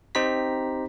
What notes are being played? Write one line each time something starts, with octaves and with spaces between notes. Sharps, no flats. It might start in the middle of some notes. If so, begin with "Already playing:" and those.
C4 D#4 G4 C5 A#5 B6